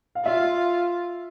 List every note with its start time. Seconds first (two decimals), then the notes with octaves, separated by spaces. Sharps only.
0.15 F5
0.25 F4 E5